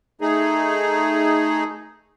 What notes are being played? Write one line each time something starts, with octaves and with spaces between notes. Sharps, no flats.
A3 D#4 G#4